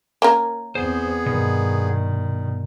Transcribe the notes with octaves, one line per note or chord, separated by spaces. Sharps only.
A#3 C#4 A#4
E2 B3 C4 G#4 C5
G2 B2 D#3